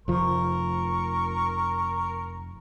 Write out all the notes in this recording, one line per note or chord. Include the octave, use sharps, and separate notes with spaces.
F1 F3 A#4 C#6